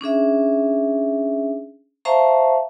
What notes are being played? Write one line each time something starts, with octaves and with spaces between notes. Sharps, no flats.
C#4 D4 G#4 E5
C5 E5 F5 A5 A#5 C#6